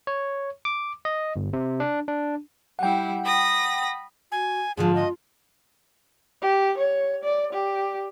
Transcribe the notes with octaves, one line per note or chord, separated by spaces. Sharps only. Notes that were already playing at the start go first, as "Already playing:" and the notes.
C#5
D6
D#5
G1
C3
D4
D4
G3 E4 F#5 G5
B5 D#6 A#6
F#4 G#5
G#2 D3 F3 F4 G#4
D#5
G4
C#5
D5
G4